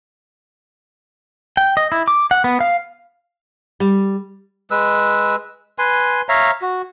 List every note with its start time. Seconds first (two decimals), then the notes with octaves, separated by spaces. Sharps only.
1.57 G5
1.77 D#5
1.92 E4
2.08 D6
2.31 F#5
2.44 B3
2.61 F5
3.80 G3
4.71 G#3 B4 E6
5.79 B4 G#5 C6
6.29 C#5 E5 F5 A#5
6.62 F#4